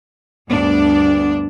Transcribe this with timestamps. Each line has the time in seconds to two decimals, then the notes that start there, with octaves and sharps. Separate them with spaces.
0.49 D2 G2 B3 D4 D5